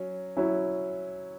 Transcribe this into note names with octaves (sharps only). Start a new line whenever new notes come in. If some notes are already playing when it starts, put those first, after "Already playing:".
Already playing: F#3 C#4
F#3 C#4 E4